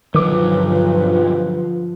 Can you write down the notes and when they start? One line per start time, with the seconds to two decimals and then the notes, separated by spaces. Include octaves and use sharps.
0.15 B1 G2 D3 D#3 F3 F#3 B4 D6